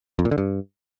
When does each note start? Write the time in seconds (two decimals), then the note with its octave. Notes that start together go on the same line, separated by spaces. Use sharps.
0.19 F2
0.25 A#2
0.31 D3
0.38 G2